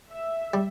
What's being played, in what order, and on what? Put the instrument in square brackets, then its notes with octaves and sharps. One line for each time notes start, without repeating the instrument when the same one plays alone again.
[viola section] E5
[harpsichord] G3